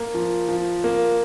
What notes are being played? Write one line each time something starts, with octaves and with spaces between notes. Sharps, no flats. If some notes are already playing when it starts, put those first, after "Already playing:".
Already playing: A#3
F3
F3
A#3